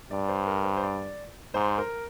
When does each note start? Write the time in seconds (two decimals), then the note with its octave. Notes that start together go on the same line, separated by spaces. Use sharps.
0.11 G2 D5
0.29 C5
0.47 A#4
0.64 C5
0.77 C5
0.83 D5
1.54 G#2 C5
1.78 A#4